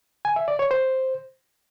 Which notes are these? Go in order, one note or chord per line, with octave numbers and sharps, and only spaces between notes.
G#5
E5
D5
C#5
C5